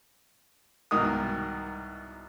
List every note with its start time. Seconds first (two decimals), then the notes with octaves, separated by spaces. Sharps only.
0.91 C2 G#2 B2 D#3 A#4 D#6